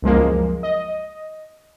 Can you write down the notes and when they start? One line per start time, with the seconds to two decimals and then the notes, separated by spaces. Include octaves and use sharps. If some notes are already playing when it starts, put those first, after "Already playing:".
0.02 C#2 F#2 F3 G#3 A#3
0.63 D#5